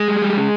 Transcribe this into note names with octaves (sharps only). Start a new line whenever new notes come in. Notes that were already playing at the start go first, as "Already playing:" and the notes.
Already playing: G#3
G3
G3
C#3